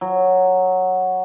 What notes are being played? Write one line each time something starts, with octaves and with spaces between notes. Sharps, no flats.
F#3